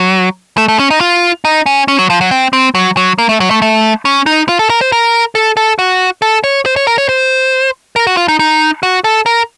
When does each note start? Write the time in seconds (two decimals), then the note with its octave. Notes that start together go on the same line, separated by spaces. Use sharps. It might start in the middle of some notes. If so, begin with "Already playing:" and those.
Already playing: F#3
0.58 A3
0.68 A3
0.79 C#4
0.90 D#4
1.01 F4
1.45 D#4
1.66 C#4
1.88 C#4
1.99 F#3
2.10 F3
2.21 F#3
2.31 C4
2.53 C4
2.75 F#3
2.97 F#3
3.18 A#3
3.29 A3
3.40 F#3
3.51 A3
3.62 A3
4.05 C#4
4.26 D#4
4.49 F4
4.59 A4
4.70 A#4
4.81 C5
4.92 A#4
5.35 A4
5.57 A4
5.79 F#4
6.22 A4
6.44 C#5
6.66 C5
6.76 C#5
6.87 A#4
6.98 C#5
7.09 C5
7.96 A#4
8.07 F#4
8.17 F4
8.28 D#4
8.39 D#4
8.83 F#4
9.04 A4
9.26 A#4